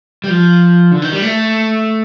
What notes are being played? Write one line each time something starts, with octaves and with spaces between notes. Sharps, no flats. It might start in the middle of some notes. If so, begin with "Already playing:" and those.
G3
F3
D3
D#3
G3
A3